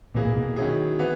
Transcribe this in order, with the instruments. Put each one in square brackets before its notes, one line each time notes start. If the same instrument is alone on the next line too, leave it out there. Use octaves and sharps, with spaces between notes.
[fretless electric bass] A#2 [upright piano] E3 A#3 E4 G#4
[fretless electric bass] A#2
B2
[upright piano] D#3 F#3 C#4 E4 G#4
E3 B3